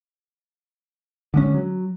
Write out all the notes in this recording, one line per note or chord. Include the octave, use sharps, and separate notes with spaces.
D3 G#3 C#4
F#3